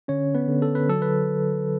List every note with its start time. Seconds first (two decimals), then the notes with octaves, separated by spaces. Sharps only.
0.08 D3 C#4 C#5
0.35 B3 B4
0.48 D3
0.62 A4
0.75 B4
0.89 F#3 A4
1.02 B4